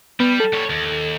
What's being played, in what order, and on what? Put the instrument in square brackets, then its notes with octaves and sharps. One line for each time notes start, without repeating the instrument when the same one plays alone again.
[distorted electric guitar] G3 [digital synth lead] B3
[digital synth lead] A4
[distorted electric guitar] G3 C#5
D#2